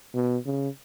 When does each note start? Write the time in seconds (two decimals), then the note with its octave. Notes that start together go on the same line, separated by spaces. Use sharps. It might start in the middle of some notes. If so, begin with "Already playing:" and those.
0.14 B2
0.46 C#3